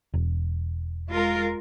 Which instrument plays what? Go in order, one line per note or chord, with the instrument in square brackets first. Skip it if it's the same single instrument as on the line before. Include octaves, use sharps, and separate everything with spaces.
[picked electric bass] E1
[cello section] G#3 F4 A#4